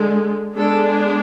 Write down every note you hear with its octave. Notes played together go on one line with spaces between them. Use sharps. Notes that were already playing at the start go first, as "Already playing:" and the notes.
Already playing: D3 G#3
G#3 B3 D4 A4